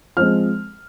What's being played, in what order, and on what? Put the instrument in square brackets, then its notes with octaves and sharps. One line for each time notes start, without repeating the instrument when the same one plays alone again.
[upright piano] F3 G#3 C4 F6